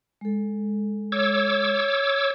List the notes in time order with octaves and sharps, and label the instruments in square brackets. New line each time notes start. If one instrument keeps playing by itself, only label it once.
[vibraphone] G#3 A4
[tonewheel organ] C#5 D6 E6